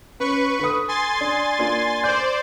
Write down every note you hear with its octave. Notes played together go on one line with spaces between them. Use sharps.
C#4 B4 C#6
D3 D#6
G#5 C6 A6
D4
A#3 D4 F4
C5 D5 G6